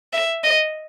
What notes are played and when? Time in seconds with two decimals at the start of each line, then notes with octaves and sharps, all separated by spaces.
0.13 E5
0.44 D#5